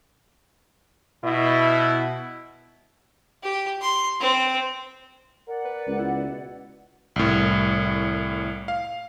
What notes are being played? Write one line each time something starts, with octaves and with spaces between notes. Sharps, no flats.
B2 E4
G4
C6
C4
A#4 D5 F#5
B4
C#2
B3 E4
B2
C2 A2
F5